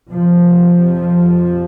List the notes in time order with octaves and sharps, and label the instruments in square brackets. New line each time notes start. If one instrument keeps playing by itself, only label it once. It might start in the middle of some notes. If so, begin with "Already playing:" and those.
[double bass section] F2 C3 F3